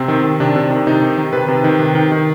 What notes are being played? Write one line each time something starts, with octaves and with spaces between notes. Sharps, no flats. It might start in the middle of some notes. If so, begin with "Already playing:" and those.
Already playing: C3 C4
D#3
D#3
C3 D4
C3
D#3
C3 D#4
D#3
D#3
C3 B4
C3
D#3
C3
D#3
D#3